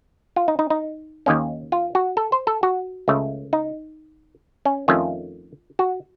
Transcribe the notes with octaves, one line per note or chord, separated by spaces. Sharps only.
F4
D#4
D#4
D#4
D#2 D#3 A#3 C#4
F4
F#4
A4
C5
A4
F#4
C#2 C#3 A3
D#4
C#4
F2 D#3 A3 C#4 F4
F#4